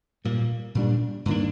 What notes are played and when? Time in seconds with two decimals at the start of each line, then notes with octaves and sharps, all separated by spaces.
0.25 A#2 G3 A#3
0.75 A#2 G3 D4
1.25 G2 D#3 A#3 D4